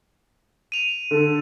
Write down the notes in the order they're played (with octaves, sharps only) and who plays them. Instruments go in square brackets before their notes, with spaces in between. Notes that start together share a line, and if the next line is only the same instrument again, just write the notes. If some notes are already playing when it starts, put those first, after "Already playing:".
[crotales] D#7 F7
[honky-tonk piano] D3 [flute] A4